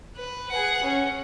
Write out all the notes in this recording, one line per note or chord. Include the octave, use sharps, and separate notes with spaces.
B4
G#4 F#5
C#4